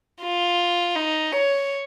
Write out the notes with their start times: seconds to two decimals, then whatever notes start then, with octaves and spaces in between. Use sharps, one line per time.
0.22 F4
0.95 D#4
1.32 C#5